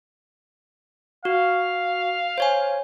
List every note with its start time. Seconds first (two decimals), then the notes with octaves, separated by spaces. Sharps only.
1.25 F#4 F5
2.38 C5 C#5 G#5